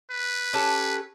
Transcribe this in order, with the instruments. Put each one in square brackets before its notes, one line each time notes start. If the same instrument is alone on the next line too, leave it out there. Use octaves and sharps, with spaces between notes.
[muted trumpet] B4
[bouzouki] C#4 G4 A4